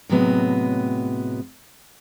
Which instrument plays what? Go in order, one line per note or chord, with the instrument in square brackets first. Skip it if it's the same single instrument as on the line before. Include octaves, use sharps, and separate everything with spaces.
[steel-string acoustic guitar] A2 C3 F#3 G#3 B3